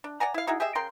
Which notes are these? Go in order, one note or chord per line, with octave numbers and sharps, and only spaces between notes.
D4
D5 F#5 G#5 A#5
E4 F5
D#4 E4 F#4 G#4
G4 G#4 D#5 E5
C#3 A#4 G5 C6